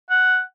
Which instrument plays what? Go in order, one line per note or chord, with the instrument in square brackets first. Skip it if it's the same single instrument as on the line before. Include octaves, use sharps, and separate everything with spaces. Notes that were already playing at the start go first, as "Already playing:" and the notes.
[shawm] F#5